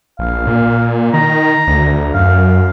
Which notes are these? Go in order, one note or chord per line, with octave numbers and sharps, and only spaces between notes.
A#1 F5
A#2
D#3 A#5
D2
F#2 F5